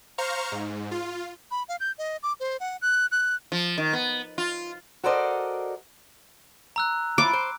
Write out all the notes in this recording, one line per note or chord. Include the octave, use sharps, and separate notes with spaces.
C5 F5 A#5 C#6 F6
G#2
F4
B5
F5
G6
D#5
D6
C5
F#5
F#6
F#6
F3
D#3
B3
F4
F#4 A4 A#4 C5 D5 D#5
A#5 E6 F#6
F3 E4 F4 D6
C5